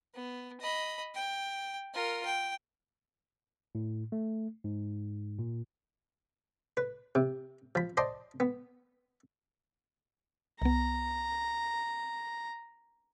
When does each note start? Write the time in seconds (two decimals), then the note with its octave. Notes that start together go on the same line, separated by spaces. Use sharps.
0.15 B3
0.60 D#5 B5
1.15 G5
1.94 F4 A#4
2.25 G5
3.75 A2
4.12 A3
4.64 G#2
5.39 A#2
6.77 B4
7.15 C3
7.75 F3 B5
7.97 C5 D5 D#5 A5 C6 D6
8.40 B3
10.62 C2 B3 A#5